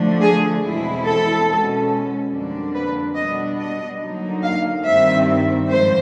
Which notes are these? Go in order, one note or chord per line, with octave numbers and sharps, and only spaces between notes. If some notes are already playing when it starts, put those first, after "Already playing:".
Already playing: D3 F3 A3 D4
G#4
E2 B2 G#3 C4 E4
A4
B2 G#3 C#4
F2 D3 G3 A#3 D4
B4
B2 G3 B3 D4 D#5
D#5
D3 F#3 A#3 D#4
F5
G2 D#3 G3 C4 E5
G#2 F3 C5